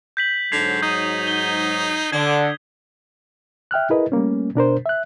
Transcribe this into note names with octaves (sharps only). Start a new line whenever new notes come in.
G6 B6 F#7
G#2 D3 F#3 G#6 C7 F7
D#4 D#6 G6 D#7
G7
D3 D4 G#6
E5 G5 F6 F#6
E4 G#4 A#4 B4 D#5
G3 A3 A#3 C#4
B2 D4 A#4 C5
E5 F#6